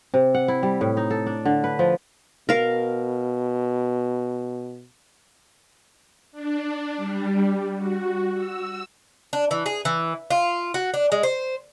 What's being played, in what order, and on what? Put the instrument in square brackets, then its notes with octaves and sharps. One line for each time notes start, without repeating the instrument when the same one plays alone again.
[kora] C3
F#5
E4
G3
A2
D#4
A4
D4
D3
B4
F3
[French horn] B2 [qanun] A#4 F5
[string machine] D4
G3
F#4
E6
[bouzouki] D4
E3
G#4
E3
F4
F#4
D4
G#3
C5